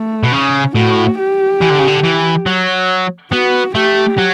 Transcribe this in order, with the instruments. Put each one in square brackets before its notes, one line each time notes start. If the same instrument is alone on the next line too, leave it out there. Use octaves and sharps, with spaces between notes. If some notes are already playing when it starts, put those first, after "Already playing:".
Already playing: [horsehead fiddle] A3
[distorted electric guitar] B2
[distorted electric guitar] C#3 [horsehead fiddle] C#4
[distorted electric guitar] A2 [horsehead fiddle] F#4
[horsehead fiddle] G4
[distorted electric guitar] E3
D3
C#3
D3
E3
F#3
[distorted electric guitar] B3 [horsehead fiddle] F#4
[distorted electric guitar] A3 [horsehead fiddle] G4
[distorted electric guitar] F#3